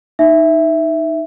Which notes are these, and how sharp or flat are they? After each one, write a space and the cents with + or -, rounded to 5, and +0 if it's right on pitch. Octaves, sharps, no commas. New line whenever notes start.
D#4 +0 E5 +0